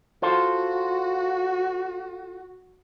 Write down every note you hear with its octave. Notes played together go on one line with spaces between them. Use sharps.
F4 F#4 A4 C5